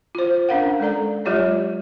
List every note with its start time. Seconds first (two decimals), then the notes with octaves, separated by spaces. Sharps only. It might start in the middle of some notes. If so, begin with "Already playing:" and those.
0.15 F4 C5
0.49 C#4 D4 A#4 F5 F#5
0.80 G#3 A4 D5 A#5
1.25 F#3 G#3 F4 G4 C#5 D5